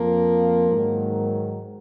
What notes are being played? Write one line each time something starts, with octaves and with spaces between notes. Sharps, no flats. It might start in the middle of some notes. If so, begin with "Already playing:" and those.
Already playing: F2 F3 A#3
G#2 D#3 F#3